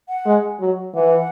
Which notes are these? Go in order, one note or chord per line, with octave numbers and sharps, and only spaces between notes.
F#5
G#3
F#3
E3 F#5